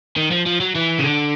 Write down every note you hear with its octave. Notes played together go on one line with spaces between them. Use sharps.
D#3
F3
F3
F#3
E3
C#3
D3